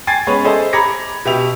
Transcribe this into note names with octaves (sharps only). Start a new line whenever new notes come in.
G5 G#5 G#6 A6 C7
G#3 B3 C#4 B4 C#5
G#4 A4 C5 D#5 E5 A5
A#5 B5 D6 G#6 A#6 C#7
B2 G4 E5 F7